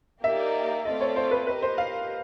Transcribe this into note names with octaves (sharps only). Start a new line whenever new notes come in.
A#3 D#4 G4 A#4 D5 E5
A3 C4 F4 A4 D5 D#5
C#5
C5
B4
G4 A#4 B4 D#5
C5
F5